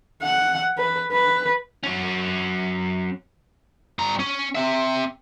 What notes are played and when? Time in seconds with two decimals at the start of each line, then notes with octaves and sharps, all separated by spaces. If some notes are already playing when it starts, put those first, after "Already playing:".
0.23 F#5
0.78 B4
1.13 B4
1.83 F#3 C#4
3.99 G2 A#5
4.19 C#4
4.55 C4 E5